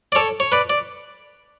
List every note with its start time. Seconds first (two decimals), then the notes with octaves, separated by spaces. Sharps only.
0.12 D5
0.15 A4 C#5
0.40 C#5
0.52 B4 D5
0.70 D5